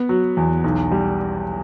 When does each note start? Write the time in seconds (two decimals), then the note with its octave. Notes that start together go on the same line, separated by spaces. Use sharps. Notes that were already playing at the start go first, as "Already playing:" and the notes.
Already playing: B3
0.09 F#3
0.37 E2
0.64 B1
0.92 G3